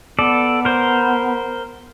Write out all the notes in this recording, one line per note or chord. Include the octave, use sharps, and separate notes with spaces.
B3 A4 D5
A#4 C5